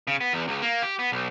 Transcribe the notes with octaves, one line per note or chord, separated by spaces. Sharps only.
C#3
B3
E2
C#2
A#3
G4
B3
B1